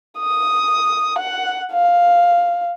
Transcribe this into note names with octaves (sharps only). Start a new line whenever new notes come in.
D#6
F#5
F5